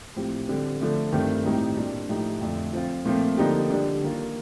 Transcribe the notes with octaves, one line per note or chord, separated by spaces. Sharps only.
A2 F3 C4 G4
D3 G3 C4
D3 F3 A3
G2 D#3 A3 C4
A2 G3 C4 D#4
A#2 G3 D4
A2 F3 A3 D#4 G4
F2 D3 A3
F3 C4 F4
A#2 F3 A3 C4 F4
D3 F3 A#3 D#4 G4
D3 G3 D4 G4
D#3 A#3 F4